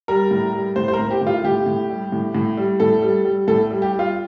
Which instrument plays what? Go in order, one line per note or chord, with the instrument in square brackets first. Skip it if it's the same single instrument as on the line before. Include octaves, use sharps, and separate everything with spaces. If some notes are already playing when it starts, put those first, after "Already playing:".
[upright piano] G3 A#4
A2
G3
A2 C5
C5
A#4
A2
G4
A2
F4
A2 G4
A2
G3
A2
A2
G3
A2 A4
G3
G3
A2 A4
G3
G4
G3
F4